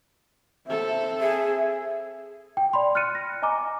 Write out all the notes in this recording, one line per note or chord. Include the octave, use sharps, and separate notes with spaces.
C4 A4 E5
G#4 E5
G5
D5 B5 C6
F6 F#6 A6 C#7 D#7
A#6
D#5 G#5 A#5 D6